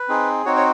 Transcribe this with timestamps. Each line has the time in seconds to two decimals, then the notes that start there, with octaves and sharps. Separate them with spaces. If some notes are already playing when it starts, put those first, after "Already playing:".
Already playing: B4
0.08 C4 D#4 G#4
0.45 C4 D#4 F#4 C#5
0.56 C#5